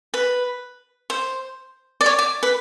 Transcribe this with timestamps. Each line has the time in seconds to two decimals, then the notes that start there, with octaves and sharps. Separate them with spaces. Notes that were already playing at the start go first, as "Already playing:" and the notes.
0.14 B4
1.10 C5
2.01 D5
2.06 C#5
2.19 D5
2.43 B4